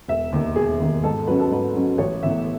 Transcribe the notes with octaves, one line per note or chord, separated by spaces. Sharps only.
E1 E5
D#2 D#3
E1 G#4
D#2 D#3
G#2 A4
F#3 C#4 B4
A4
G#2 B4
F#3 C#4
A1 C#5
A2 E3 B3 E5